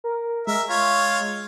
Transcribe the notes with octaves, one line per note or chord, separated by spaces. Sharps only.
A#4
G#3 A#4 E5
F4 C#5 F5